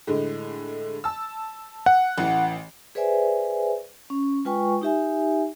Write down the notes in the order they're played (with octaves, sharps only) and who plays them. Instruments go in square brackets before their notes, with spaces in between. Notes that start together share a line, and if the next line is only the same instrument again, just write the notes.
[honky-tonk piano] A2 D3 G#3
A5 E6
[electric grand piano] F#5
[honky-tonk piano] A1 E3
[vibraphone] G#4 B4 C5 D5 E5 G#5
C#4
G#3 F4 B4 G5 G#5 C#6
D#4 G4 E5 G#5